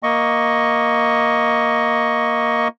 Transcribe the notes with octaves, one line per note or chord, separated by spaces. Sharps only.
A#3 D#5 C#6